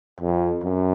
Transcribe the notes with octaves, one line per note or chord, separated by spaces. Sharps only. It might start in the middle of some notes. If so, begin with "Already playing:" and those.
F2
F#2